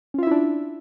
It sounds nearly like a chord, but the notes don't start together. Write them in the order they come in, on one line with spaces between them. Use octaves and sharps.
C#4 F4 E5 E4 D4